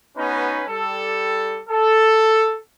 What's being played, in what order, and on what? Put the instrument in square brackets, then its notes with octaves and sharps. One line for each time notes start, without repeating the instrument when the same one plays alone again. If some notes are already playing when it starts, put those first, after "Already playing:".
[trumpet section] B3 C#4 D#4 F#4 B4
G3 A4
A4